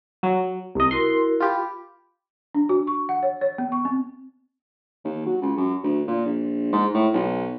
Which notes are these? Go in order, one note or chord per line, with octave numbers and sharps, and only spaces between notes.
F#3
C2 D#5
E4 F#4 A#4 C6
F4 G4 B5
D4
F#4
C#6
F#5
C#5
C#5
B3
C#6
C4
D#2
F#3
C#2
F#2
D2
A#2
A#1
G#2
A2
B1